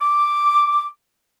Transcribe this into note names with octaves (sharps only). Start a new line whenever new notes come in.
D6